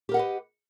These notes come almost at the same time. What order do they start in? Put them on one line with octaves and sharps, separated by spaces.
G4 A#4 F#5 D#5 B4